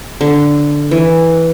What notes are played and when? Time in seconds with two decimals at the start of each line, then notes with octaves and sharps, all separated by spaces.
0.21 D3
0.91 E3